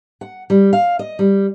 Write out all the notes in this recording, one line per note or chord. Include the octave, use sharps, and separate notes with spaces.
F#5
G3
F5
D#5
G3